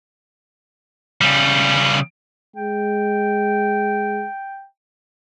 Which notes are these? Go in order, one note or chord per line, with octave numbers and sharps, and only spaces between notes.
C#3 G3
G#3 G5